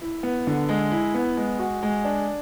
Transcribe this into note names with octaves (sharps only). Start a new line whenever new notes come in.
E4
B3
D3
G#3
E4
B3
G#3
F#4
G#3
D4